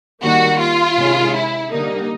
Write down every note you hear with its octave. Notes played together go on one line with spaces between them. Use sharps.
D#3 G3 A#3 F#4
F4
C3 D#3 G#3 C#4
E4
D3 G3 A#3 D#4